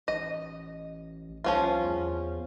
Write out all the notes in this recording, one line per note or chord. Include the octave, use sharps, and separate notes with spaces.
A1 D#5
C2 F3 C#4 F4
E2